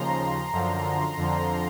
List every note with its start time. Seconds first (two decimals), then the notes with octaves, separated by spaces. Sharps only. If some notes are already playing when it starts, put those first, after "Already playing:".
Already playing: D#2 C#3 F3 A#5 C6
0.52 F#2 D3 F3
1.16 F2 D3 F3